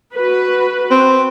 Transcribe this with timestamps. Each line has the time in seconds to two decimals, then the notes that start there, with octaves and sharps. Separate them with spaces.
0.16 F#4 B4
0.91 C4